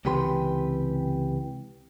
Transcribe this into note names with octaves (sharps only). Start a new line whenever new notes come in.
C#2 C3 E3 G4 B4 C6